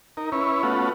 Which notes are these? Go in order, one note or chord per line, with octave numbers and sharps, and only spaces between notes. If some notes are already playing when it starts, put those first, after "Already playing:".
D#4 A#4
C#4 E4 B4 C#5
A3 B3 C#4 F4 F#4